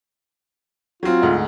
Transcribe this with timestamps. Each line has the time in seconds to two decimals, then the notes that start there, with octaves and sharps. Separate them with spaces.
1.03 F#3 C4 F4
1.22 D2 G#2